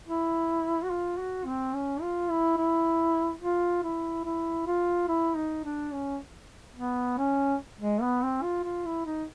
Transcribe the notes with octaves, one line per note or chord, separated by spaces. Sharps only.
E4
F#4
F4
F#4
C4
C#4
F4
E4
E4
F4
E4
E4
F4
E4
D#4
D4
C#4
B3
C#4
G#3
B3
C4
F4
F4
E4
D#4